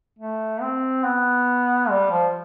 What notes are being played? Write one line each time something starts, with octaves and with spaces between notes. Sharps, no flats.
A3
C4
B3
G3
F3